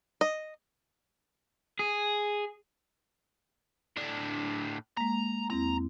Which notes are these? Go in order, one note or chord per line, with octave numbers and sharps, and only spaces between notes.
D#5
G#4
A2 D4
G#3 A#3 A#5
E2 C4 E4 A#5